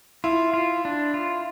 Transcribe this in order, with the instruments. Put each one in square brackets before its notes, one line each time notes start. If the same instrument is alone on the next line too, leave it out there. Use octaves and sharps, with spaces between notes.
[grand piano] E4 [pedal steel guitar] F4
[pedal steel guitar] F4
D4
F4